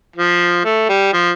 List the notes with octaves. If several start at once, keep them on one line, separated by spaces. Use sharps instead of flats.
F3
A3
G3
F3